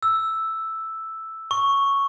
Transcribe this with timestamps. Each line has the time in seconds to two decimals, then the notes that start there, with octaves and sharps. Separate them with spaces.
0.03 E6
1.51 C#6